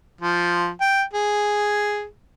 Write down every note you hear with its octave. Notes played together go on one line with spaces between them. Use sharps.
F3
G5
G#4